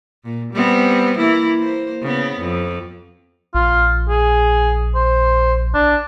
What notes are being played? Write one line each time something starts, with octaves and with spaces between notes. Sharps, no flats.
A#2
G3 B3 C4
E3 A#3 E4
A#3 C5
C#3 B3
F2
A#1 F4
G#4
C5
D4